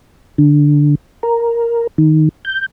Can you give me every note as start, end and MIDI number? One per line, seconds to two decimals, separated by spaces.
0.38 0.95 50
1.23 1.87 70
1.98 2.29 51
2.45 2.66 91